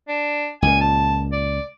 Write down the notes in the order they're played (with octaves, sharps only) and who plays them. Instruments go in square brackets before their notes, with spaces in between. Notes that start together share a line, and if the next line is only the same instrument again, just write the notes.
[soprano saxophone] D4
[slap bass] C#2 A#2 [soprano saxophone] G#5
[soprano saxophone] A5
D5